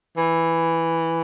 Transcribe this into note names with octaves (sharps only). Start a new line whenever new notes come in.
E3